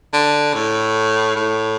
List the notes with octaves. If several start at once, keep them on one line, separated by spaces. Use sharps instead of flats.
D3
A2
A2